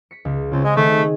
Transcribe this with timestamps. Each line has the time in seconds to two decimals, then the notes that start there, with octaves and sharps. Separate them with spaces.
0.11 B6 C#7
0.25 C#2
0.51 C#2 C#3 C4
0.64 G#3 D#5 G#5
0.76 D#3 A3
0.90 G#4